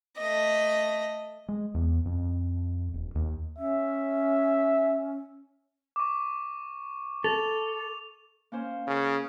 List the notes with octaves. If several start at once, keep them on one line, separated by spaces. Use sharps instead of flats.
A3 D#5
G#3
E2
F2
D#1
D#2
C#4 E5
C#6 D6
A4 F7
A#3 C#4 C5
C#3 A#4